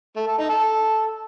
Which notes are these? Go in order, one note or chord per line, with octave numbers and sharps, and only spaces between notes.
A3
A4
D#4
A4